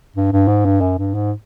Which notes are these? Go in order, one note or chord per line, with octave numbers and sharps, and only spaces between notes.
G2
G2
G#2
G2
F#2
G2
G#2